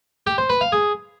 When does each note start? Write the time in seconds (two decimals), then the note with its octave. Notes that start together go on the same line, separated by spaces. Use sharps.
0.27 G4
0.38 C5
0.49 B4
0.61 F5
0.72 G#4